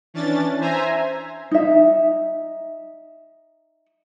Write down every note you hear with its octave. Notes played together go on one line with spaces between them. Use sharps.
E3 C#4 D4 A6
C5 E5 G#5 A#5
D#4 E5